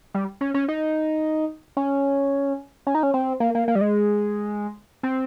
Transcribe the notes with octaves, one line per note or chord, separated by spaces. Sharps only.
G3
C#4
C#4
D#4
C#4
C#4
D#4
C#4
C4
A#3
A#3
A#3
G3
G#3
C4